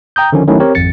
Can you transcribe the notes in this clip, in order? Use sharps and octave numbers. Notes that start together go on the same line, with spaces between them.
G5 A#5 D#6 G6
D3 D#3 F3 C#4
D#3 F#3 A3 C#4 D#4 E4
C4 G4 A#4 C#5
G#1 F2 A6 C#7